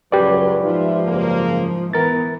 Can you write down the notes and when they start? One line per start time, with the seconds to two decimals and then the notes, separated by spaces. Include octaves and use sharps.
0.12 C#2 F#2 F#3 C#4 G4 B4 D5
0.64 G#2 F3 D#4 F4 E5
1.06 F#1 A#3
1.93 E3 B3 A#4 A6